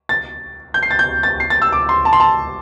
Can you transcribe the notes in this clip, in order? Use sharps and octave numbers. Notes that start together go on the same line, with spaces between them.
A6
G6
C7
A6
G6
A6
C7
A6
E6
D6
C6
A5
C6
A5